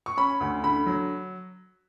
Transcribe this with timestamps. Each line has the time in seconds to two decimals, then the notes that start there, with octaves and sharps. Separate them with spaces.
0.06 C#6
0.17 C#4 B5
0.40 D2
0.63 D3 B5
0.86 F#3